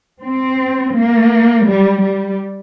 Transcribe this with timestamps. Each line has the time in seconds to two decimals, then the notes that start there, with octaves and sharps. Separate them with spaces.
0.23 C4
0.94 A#3
1.66 G3
2.02 G3